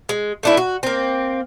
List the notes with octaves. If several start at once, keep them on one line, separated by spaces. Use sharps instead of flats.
G#3
A3 D4 E4
F#4
A#3 C4